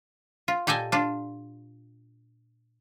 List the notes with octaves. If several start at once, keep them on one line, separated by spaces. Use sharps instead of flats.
F4
A#2 G4 A4 D#5 G#5
D4 F4